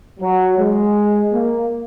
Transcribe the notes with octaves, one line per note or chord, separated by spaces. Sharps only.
F#3
G#3
A#3